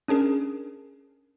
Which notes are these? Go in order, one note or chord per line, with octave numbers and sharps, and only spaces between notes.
C#4 D4 G#4 A#4